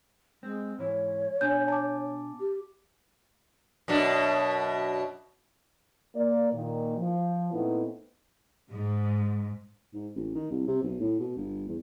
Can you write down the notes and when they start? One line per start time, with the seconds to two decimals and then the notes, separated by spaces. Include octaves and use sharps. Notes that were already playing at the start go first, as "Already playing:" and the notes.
0.43 G#3 C4
0.79 G#2 E3 C#5
1.41 B2 D4 G#5 G6
1.68 A5 D6
2.40 G4
3.88 F#2 B2 D4
6.15 A#3 D5
6.53 A#2 D#3
6.98 F3
7.52 A#2 A3 B3 C4 D#4 E4
8.71 G#2
9.94 G#2
10.16 A1
10.35 D#3
10.50 C2
10.67 C3
10.83 B1
11.00 A2
11.19 B2
11.37 G1
11.68 E2